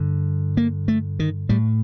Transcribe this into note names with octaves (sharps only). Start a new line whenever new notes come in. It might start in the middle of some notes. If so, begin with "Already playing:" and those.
Already playing: G2 D3
A#3
A3
D#3
A2 G3